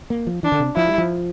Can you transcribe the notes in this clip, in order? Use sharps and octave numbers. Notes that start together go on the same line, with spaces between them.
A#3
F3
E3 D4
D3
C3
F3 E4
G3
F3